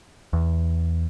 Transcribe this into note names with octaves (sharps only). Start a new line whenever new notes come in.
E2